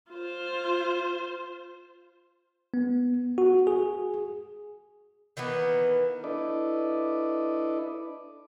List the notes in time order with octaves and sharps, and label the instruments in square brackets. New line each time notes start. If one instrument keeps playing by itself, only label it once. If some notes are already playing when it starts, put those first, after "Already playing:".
[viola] F4 C5
[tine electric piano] B3
F#4
G#4
[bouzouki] D#3 E3 A#3 B3
[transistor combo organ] D4 E4 A4 B4 D5 D#5